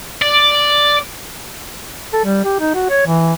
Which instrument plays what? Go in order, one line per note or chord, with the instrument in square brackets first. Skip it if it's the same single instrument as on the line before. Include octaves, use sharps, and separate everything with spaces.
[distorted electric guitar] D5
[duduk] A4
G3
G4
D#4
F#4
C#5
E3